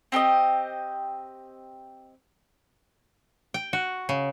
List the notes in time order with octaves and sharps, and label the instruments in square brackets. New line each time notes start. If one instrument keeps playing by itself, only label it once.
[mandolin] C4 G4 A#4 D#5
[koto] G5
F#4
C#3